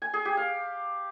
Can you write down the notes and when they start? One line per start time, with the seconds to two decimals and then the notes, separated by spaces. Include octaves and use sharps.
0.02 G#5
0.14 G#4
0.25 G4
0.37 F5